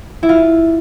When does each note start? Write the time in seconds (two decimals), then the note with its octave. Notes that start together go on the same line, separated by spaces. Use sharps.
0.23 E4
0.29 F4